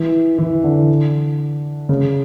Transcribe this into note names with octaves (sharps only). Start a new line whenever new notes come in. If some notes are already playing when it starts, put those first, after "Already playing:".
Already playing: E3
E3
D3
C#3